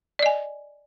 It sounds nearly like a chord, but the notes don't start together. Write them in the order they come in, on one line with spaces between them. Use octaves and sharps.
D5 D#5 G#5